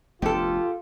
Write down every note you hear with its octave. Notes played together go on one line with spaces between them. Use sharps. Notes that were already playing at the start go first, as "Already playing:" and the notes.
F1 D2 B3 F4 G4 A4